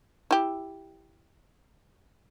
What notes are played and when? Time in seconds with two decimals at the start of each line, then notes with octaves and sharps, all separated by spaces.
0.31 E4 G4